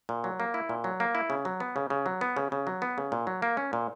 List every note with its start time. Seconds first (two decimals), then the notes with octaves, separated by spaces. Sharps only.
0.09 A#2
0.24 F#3
0.40 A#3
0.54 E4
0.69 A#2
0.84 F#3
1.00 A#3
1.15 E4
1.30 C#3
1.45 F#3
1.60 B3
1.76 C#3
1.90 C#3
2.06 F#3
2.21 B3
2.37 C#3
2.52 C#3
2.67 F#3
2.82 B3
2.98 C#3
3.12 A#2
3.27 F#3
3.42 A#3
3.57 C#4
3.73 A#2